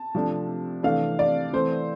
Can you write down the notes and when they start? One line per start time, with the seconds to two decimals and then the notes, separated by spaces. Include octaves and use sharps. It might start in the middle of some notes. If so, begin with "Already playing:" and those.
Already playing: A5
0.15 C3 F3 A3 D4
0.83 C3 E3 A3 D4 F5
1.19 D5
1.53 E3 A3 C4 C5